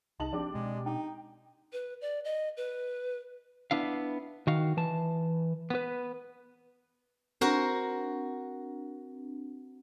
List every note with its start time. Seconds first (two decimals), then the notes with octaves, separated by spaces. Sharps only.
0.20 C2 D#4 A5 F#7
0.33 F3 G#3 C4 D4 G4 D6
0.54 B2 G#3 C4
0.86 D#4 G5
1.73 B4
2.01 D5
2.24 D#5
2.57 B4
3.71 B3 D4 E4 F5
4.47 D#3 F#4 F5
4.77 E3 A5
5.70 B3 B4
7.41 C4 D4 F#4 A#4 C5